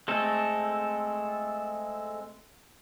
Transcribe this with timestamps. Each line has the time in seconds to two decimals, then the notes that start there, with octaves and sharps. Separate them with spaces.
0.08 G#3 A3 C4 A4